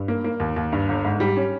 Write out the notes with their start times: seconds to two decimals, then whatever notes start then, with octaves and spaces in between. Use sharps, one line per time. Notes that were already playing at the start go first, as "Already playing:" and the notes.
Already playing: G2
0.08 A#3
0.24 A#3
0.40 D#2
0.56 D#2
0.72 G2
0.89 G1
1.05 G#2
1.20 G3
1.37 C#4